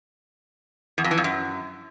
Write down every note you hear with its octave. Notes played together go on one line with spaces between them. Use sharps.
E2
F2
E3
F2
F#2